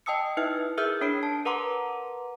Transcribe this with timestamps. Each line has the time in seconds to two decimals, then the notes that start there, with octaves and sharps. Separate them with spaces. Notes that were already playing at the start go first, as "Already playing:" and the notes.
0.06 D#5 G5 A5 D#6 E6 C#7
0.37 D#4 E4 B4 E5 F6
0.77 G#4 A#4 E5 E6 F6 G6
1.01 D4 C#5 B5 C7 D7
1.23 A5
1.45 A#4 B4 F#5 A#5 C6 D6